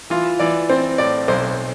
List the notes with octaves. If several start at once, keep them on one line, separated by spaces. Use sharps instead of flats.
E3 F4
E3 D5
C4 C5
A2 D5
B1 C5